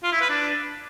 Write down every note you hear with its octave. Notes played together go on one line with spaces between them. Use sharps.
F4
E4
B4
D4